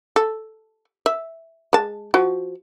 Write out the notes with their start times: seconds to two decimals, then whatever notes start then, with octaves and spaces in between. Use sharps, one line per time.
0.16 A4
1.06 E5
1.73 G#3 A5
2.14 F3 F#4